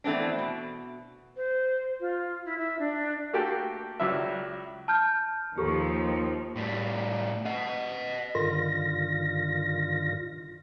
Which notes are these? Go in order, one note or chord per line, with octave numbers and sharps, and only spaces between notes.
E3 A3 B3 C4 D4
B2
C5
F4
E4
E5
D4
A3 A#3 F#4 G4 A4 G5
C#2 F#3 G3 E5
A5 F6 G6
D#2 F3 G4 A4 C#6
A2 G3
D#5 F#5
G2 D3 D#3 F4 A#6